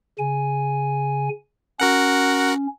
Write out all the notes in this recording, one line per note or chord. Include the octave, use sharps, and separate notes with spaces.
C#3 G#5
C#4 F#4 A#4 F#5